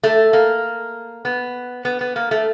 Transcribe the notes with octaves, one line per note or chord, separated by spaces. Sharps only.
A3
A#3
B3
B3
B3
A#3
A3